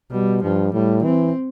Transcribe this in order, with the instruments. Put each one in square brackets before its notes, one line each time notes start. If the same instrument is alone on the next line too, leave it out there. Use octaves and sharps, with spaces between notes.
[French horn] B2 [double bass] G3
[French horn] G2 [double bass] F3
[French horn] A2 [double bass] G3
[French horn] E3 [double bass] C4